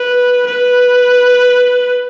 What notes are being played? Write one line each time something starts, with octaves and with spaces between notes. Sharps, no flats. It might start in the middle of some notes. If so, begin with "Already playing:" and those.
Already playing: B4
B4